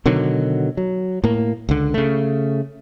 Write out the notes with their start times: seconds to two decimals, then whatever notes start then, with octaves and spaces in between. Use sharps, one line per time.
0.06 B2 D3 D#3 F#3
0.77 F#3
1.24 A2 A#3
1.69 C#2 D3
1.94 C#3 A3